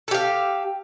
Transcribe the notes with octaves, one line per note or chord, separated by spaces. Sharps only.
G4 A4 F5